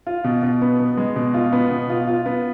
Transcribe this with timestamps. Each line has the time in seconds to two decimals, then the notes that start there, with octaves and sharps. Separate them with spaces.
0.07 F4
0.24 B2
0.43 B2
0.62 B3
0.79 B3
0.97 G#3
1.16 B2
1.34 F4
1.53 B3
1.70 B2
1.90 F4
2.07 F4
2.26 B3